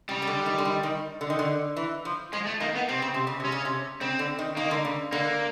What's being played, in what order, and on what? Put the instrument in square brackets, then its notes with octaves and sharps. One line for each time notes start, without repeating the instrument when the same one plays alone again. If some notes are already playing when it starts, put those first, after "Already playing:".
[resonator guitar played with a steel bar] C#3 [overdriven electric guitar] G3
[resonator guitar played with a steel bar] C#3
D3
D#3
D3
D#3
D#3
D3
D#3
D3
E3
F3
[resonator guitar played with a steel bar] F3 [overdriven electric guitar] G#3
[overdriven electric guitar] A3
[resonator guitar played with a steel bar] D#3 [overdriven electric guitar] A#3
[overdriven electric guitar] B3
[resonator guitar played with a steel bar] C3 [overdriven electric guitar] C4
[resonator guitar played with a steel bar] C#3
C3
C#3
[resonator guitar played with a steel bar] C3 [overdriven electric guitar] C#4
[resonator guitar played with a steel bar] C#3
C3
[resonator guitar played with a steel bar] C#3 [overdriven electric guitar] C4
[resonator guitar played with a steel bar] D3
D#3
[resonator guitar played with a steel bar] D#3 [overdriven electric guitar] A#3
[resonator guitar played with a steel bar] D3
C#3
[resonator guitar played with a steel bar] D3 [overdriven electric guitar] A#3